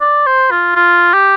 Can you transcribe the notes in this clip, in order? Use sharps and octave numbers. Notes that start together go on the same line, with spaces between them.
D5
C5
F4
F4
G4